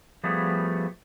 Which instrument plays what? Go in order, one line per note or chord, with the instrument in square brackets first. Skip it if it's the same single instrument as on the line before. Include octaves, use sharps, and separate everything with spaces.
[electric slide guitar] F3 G3 A3 B3 F#4 G#4